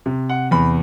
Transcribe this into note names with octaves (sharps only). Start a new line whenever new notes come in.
C3
F#5
E2 B5